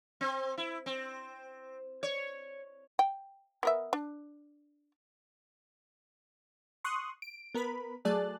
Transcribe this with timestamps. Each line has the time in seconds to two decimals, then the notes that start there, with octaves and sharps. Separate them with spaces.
0.21 C4
0.58 E4
0.86 C4
2.03 C#5
2.99 G5
3.63 B3 A#4 E5
3.93 D4
6.84 C6 C#6 D#6 F#6
7.22 D7
7.54 B3 A#4 B4 B5
8.05 F#3 A3 G#4 D5 A5 F#6